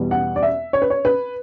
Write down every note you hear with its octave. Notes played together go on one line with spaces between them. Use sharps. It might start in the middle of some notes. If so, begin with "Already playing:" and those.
Already playing: E2 B2 G3 B3
F#5
D5
E5
C#5
B4
C#5
B4